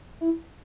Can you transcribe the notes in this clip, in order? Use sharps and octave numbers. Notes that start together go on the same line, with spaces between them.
E4